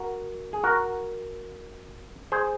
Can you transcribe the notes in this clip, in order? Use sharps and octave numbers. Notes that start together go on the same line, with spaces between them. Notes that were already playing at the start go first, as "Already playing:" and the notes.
Already playing: F#4 A#4
G#4
F#4 A#4
G#4 C5